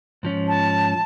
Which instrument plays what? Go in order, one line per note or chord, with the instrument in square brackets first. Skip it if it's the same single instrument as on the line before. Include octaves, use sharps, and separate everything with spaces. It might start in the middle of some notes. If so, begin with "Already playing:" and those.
[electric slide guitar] G#2 F3 C#4
[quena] A5